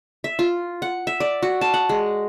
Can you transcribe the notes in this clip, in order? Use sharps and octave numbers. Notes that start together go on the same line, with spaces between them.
E5
F4
F#5
E5
D5
F#4
A5
F#5
G#3